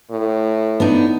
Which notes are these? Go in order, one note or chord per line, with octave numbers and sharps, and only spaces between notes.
A2
B3 D4 D#4